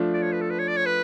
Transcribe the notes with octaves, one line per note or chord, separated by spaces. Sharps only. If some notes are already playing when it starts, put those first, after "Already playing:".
Already playing: F3 A3 D4 F4
D5
C#5
B4
A4
B4
C#5
D5
C#5
B4